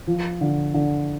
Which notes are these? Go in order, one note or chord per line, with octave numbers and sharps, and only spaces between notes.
F3
D3
D3